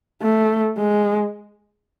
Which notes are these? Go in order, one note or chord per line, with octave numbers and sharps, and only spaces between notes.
A3
G#3